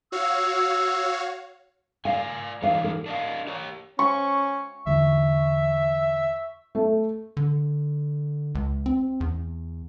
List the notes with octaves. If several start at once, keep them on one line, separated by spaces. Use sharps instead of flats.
F#4 C#5 F5 E6
A#4 D5 F5 G#5
E3 D#4 G4 B4 F5
A#4
D4 D#5 F5
G4 C#5
C#4 C#6
E2 D3 E3 E5
A3
D3
C#2
C4
E2